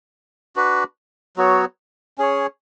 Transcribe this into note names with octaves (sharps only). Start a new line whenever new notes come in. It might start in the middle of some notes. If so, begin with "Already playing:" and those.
D4 F#4 B4
F#3 B3 F#4 C#5
C#4 G#4 C#5